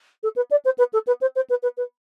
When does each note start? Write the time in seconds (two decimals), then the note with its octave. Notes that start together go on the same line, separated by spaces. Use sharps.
0.23 A4
0.36 B4
0.51 D5
0.65 C5
0.78 B4
0.93 A4
1.07 B4
1.21 C5
1.36 C5
1.50 B4
1.63 B4
1.77 B4